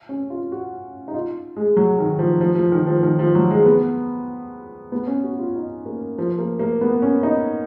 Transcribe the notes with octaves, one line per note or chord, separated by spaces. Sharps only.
C#4
F4
F#4
D#4
F4
G#3
F#3
D#3
F3
F3
F3
D#3
F3
D#3
F3
F#3
G#3
B3
B3
C#4
F#4
F4
D#4
A#3
F3
A#3
A#3
B3
C#4
D#4